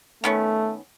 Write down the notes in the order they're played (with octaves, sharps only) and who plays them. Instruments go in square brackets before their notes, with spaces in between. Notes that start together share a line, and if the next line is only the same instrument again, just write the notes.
[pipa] D#3 B3 C#4 [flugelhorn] A3